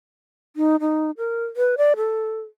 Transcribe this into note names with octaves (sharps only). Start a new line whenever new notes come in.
D#4
D#4
A#4
B4
D5
A4